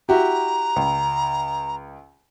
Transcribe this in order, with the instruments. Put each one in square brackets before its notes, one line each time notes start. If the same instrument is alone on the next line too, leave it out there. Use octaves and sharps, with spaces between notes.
[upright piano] E4 F#4 G4 [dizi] A#5
[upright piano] C#2